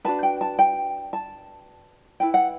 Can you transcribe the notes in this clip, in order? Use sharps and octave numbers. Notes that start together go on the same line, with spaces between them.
D4 F#4 B4 A5
G5
A5
G5
A5
E4 B4 G5
F#5